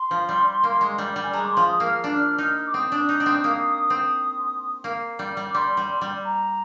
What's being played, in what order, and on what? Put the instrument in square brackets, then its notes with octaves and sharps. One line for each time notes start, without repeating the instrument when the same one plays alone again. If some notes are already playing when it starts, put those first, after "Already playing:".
Already playing: [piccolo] C6
[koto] F3
G3
A#3
G#3
G3
G3
[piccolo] G#5
[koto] G#3 [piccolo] A#5
[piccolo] D6
C6
[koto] F3
[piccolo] D#6
[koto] A#3
[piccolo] F6
[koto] D4
D#4
[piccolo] D6
[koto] C4 [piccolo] D#6
[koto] D4
D#4
D4
C4
A#3
C4
A#3
G3
G3
[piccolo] D6
[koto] G3 [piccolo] C6
[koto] G3
G3
[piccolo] A#5